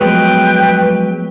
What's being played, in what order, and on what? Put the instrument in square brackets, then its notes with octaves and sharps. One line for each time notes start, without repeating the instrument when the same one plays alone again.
[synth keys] F3 A3 B3 [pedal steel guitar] F#3 G#3 [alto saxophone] B4 [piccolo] G5